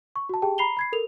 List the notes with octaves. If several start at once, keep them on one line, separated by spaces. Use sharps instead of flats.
C#6
F#4 A5
G4 G#4 G5 A5
A#5 B5 C7 F7 G7
B5 G#6 C7
A4 A#4 F7